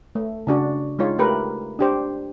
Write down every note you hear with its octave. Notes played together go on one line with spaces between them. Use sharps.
A3
C#3 D4 F#4
G#3 D#4 F4 C#5
A3 G4 A#4 B4
D4 G4 C5